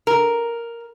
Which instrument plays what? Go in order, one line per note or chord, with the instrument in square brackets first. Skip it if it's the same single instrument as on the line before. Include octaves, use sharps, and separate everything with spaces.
[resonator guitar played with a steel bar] A#4